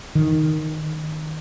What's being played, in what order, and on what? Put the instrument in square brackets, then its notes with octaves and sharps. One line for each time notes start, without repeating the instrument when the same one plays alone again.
[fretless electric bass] D#3